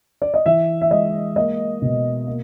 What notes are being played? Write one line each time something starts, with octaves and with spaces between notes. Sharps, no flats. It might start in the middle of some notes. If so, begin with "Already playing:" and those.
D5
D#5
E3 E5
E5
G#3 D#5
A#3 D#5
B2
A#3